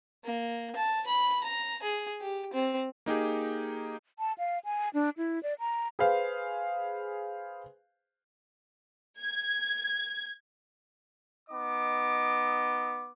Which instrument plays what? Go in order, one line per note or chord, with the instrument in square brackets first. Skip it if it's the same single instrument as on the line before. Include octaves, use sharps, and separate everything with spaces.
[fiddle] A#3
A5
B5
A#5
G#4
G4
C4
[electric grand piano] A#3 D#4 G4 G#4
[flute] A5
F5
G#5
D4
E4
D5
A#5
[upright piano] G#4 B4 C5 F5
[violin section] G#6
[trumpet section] B3 D#4 D#5 D6